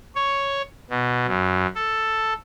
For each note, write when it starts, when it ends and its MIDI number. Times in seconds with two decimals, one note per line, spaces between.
0.15 0.62 73
0.90 1.27 47
1.27 1.66 42
1.75 2.33 69